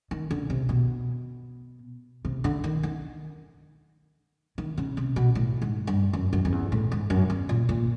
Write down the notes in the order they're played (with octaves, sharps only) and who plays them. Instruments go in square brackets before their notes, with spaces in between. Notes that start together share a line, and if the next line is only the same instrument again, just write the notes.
[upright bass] D#3
D3
C3
B2
C3
D3
D#3
D#3
D#3
C#3
C3
B2
A2
G#2
G2
F#2
F#2
F2
E2
A2
G#2
F#2
E2
A#2
A#2